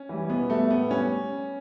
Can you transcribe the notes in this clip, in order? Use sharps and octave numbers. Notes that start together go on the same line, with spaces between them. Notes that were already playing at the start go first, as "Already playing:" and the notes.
Already playing: C#4
E3 G3
B2 B3
G3 A3
A2 B3
G3 C#4